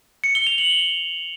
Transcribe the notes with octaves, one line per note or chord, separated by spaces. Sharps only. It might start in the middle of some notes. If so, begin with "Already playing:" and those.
C#7
G7
F7
F#7